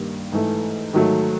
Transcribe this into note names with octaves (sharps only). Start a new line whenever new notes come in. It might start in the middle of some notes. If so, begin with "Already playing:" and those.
Already playing: G2 D#3 G3 A#3
G#2 E3 A3
G#2 D#3 F#3 A3